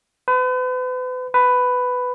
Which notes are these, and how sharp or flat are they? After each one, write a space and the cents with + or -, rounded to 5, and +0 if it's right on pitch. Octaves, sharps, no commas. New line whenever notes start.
B4 +40
B4 +10